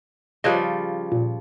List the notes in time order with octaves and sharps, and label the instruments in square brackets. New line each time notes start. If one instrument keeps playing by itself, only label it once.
[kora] C#3 F3 G3 [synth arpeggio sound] B4 C#5 D#5
[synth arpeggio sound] A#2